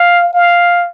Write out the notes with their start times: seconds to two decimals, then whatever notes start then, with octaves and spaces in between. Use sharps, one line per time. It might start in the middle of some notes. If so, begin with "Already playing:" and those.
Already playing: F5
0.33 F5